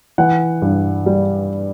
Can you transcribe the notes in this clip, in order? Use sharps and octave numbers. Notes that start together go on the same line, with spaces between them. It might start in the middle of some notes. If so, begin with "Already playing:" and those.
E3 F#5
G2
G3